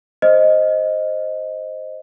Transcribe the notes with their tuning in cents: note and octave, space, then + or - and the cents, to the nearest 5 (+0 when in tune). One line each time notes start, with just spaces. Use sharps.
C5 +0 D#5 +0